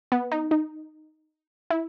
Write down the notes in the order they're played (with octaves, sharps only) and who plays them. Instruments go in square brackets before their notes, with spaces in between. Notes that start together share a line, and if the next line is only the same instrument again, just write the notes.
[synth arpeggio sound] B3
D#4
D#4
E4